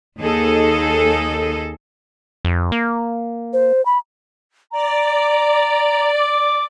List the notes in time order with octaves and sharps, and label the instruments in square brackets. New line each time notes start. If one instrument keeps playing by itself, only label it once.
[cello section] D#2 D#4 G#4 A4 D#5
[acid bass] F2
A#3
[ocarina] C5
B5
[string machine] D5 [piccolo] A#5
[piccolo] D6